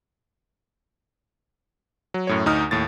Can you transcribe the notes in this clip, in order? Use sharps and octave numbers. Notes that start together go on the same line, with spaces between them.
F#3
F#2 A2 C#5
D2 D#4 D#6 F6
D#2 A2 A6